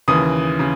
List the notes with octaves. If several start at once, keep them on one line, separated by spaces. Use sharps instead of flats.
D#2 C#3 E3 D#6
C#3